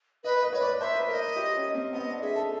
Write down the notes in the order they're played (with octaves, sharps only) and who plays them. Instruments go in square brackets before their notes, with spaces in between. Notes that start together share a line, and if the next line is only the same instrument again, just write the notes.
[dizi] B4 [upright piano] D#5
[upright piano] D#5
[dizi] B4 [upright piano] C#5
[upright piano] D5
[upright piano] C5 [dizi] E5
[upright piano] B4
[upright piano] A#4 [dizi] E5
[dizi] D#5
[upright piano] G4
C#4
C4
[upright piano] B3 [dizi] D#5
[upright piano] D4
[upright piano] G#4 [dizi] E5
[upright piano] A4